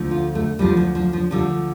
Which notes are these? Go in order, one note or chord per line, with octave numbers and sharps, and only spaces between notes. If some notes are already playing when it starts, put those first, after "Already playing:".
Already playing: D2 D3 F3
F4
A3
D2 D3 F3 G3
F3
F3
F3
D2 D3 F3 G3